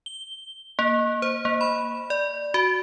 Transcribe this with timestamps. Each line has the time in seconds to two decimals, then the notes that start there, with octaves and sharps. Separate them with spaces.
0.06 G7
0.79 A#3
1.22 C5
1.45 A#3
1.61 B5
2.10 D5
2.54 F#4